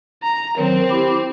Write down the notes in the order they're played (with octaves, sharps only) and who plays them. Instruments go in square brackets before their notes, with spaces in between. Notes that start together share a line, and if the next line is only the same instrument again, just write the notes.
[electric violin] A#5
[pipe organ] D#3 F#3 [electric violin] C4
[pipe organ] E4 G4